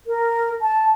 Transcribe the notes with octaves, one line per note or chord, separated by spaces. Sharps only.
A#4
A5